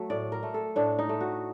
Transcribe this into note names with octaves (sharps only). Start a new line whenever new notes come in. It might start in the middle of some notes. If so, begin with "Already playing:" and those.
Already playing: F#3 A3
A2 D5
A#4
A3
A4
A2 D4
D#4
A3
F#4